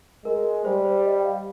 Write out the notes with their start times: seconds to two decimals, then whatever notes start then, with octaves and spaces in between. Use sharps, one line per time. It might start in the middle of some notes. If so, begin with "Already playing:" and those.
0.25 G#3 A#4
0.65 G3 C5
0.85 C5
1.05 D#5
1.19 G5
1.25 F5